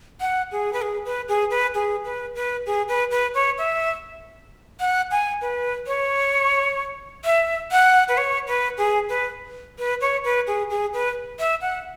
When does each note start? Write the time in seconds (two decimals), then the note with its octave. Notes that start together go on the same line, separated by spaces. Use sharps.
0.21 F#5
0.51 G#4
0.73 B4
0.82 G#4
1.05 B4
1.28 G#4
1.50 B4
1.74 G#4
2.04 B4
2.35 B4
2.66 G#4
2.88 B4
3.11 B4
3.34 C#5
3.58 E5
4.80 F#5
5.11 G#5
5.41 B4
5.87 C#5
7.24 E5
7.71 F#5
8.08 B4
8.17 C#5
8.47 B4
8.78 G#4
9.09 B4
9.78 B4
10.01 C#5
10.24 B4
10.47 G#4
10.70 G#4
10.93 B4
11.39 E5
11.61 F#5